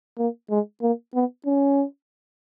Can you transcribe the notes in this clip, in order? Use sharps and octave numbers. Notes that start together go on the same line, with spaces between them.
A#3
G#3
A#3
B3
C#4